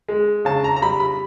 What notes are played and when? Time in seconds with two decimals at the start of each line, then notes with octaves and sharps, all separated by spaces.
0.09 G#3
0.45 C#3 A5
0.64 A#5
0.76 A#5
0.82 G3 B5
1.00 B5